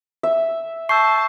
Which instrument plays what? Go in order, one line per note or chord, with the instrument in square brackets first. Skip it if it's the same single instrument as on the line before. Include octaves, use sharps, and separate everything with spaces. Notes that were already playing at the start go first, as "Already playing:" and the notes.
[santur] E5
[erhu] A5 [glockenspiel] C#6 [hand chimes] E6 G6 C7